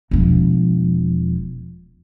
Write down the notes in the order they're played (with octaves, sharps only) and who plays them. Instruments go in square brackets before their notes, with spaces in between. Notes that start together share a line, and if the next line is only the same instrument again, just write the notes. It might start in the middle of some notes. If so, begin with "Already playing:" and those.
[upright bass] E1 F3